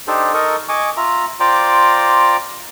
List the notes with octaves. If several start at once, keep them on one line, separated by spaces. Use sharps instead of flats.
D4 D#4 G4 A4 C5
D#4 A4 A#4 D#5 C#6 D#6
D#5 G#5 C#6 D6
F4 E5 A#5
F4 C5 D5 G5 A#5 D6